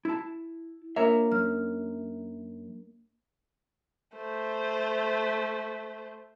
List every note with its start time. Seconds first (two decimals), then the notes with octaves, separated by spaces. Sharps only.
0.05 E4 A5
0.96 A#3 D4 F4 A#4 C#5 E5
1.32 F#2 F6
4.15 A3 C5